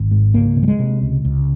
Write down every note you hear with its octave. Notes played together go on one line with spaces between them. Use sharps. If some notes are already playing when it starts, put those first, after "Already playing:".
Already playing: G#1
G#2
C#2 A#3
C3
G3
G#3
C3
C#2
C#2